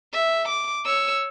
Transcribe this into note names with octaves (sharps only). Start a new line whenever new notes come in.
E5
D6
C#5 E6